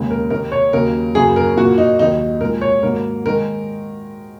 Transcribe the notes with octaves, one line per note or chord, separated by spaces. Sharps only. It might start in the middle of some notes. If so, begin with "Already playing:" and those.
Already playing: D#2 C#3 G#3
A#4
D#2 D#3 A#3 A#4
C#5
D#2 C#3 F#3 A#3 A#4
F#2 C#3 F#3 A#3 G#4
A#4
A#2 A#3 F#4
D#4
D#2 D#3 F#3 D#4
A#2 G#3 A#4
C#5
G#2 D#3 F#3 A#3 A#4
D#3 G#3 A#4